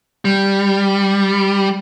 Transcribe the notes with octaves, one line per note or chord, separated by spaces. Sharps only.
G3